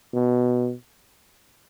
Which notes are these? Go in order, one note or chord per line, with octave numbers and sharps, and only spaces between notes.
B2